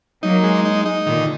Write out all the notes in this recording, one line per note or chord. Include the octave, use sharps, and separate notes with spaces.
F#3 A#3 D#4
G#3
D#4
D#4
A#2 D3 D#3